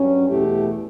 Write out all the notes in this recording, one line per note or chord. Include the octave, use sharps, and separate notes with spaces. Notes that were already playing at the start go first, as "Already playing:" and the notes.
Already playing: G2 F#3 C#4
E2 B2 A3 E4 G4